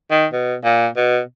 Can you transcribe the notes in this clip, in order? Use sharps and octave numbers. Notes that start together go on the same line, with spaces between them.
D#3
B2
A#2
B2